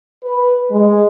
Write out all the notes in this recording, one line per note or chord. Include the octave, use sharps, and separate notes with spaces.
B4
G#3